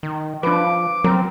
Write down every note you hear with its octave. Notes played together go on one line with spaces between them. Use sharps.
D#3
F3 D4 B4 D6
F#3 C4 A#4